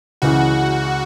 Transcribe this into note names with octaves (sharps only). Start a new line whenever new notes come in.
C#2 C#3 E3 F#4